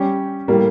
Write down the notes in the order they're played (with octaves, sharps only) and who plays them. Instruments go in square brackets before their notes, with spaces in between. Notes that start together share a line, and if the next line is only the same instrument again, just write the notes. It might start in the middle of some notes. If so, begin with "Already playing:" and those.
Already playing: [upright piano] G3 C#4 G4
A2 G3 A#3